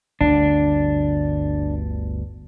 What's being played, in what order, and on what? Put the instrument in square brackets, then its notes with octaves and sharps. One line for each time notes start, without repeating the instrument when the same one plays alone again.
[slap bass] G1 D2 G2 [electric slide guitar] D4